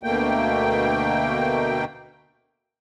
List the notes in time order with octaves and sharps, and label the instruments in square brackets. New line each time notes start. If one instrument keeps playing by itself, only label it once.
[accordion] D2 B2 A3 A#3 G5